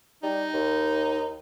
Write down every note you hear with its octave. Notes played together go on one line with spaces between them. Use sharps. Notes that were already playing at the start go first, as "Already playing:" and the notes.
G3 D#4
D#2